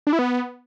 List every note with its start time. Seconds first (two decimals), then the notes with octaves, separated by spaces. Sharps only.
0.07 D4
0.13 E4
0.19 B3